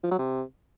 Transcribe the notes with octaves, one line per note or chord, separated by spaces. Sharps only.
F3
F#3
C3